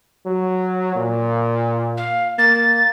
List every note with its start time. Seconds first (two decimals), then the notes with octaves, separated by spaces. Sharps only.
0.26 F#3
0.96 A#2
1.97 F5
2.39 A#3 A6